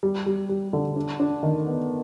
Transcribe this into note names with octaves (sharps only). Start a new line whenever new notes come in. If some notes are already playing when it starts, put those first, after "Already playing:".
G3
G3
G3
D3
D4
D4
D#3
B3